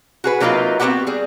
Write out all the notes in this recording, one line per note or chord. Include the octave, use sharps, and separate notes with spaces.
F#4 G#4 B4
C3 F#3 A#3 D#4 F4 B4
B3 C4 D#4 F#4 G4 F#5
G3 G#4